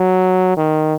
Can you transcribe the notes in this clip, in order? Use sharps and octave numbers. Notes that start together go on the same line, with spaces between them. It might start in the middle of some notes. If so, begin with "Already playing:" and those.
Already playing: F#3
D#3